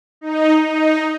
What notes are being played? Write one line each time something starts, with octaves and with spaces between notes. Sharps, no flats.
D#4
D#4